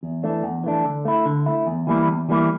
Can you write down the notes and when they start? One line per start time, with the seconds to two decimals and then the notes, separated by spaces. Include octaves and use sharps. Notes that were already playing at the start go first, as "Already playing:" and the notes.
0.03 E2
0.23 E3 A3 D4
0.43 E2
0.64 E3 A3 D4
0.85 D3
1.05 A3 E4
1.25 D3
1.46 A3 E4
1.67 E2
1.87 E3 G3 A#3 E4
2.08 E2
2.29 E3 G3 A#3 E4